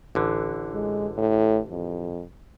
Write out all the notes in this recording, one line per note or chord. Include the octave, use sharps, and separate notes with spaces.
A1 D3 E3
G#3
A2
F2